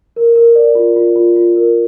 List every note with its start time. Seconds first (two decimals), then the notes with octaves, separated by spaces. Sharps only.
0.16 A#4
0.36 A#4
0.55 D5
0.75 F4
0.96 F4
1.15 F4
1.36 F4
1.56 A#4